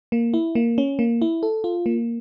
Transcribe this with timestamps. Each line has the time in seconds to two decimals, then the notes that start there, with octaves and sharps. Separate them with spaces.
0.12 A#3
0.34 E4
0.55 A#3
0.78 C#4
0.99 A#3
1.22 E4
1.43 A4
1.64 F4
1.86 A#3